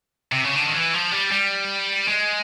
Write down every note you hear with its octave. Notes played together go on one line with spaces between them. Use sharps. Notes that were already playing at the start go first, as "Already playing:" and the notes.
C3
C#3
D3
D#3
E3
F3
G3
G3
G#3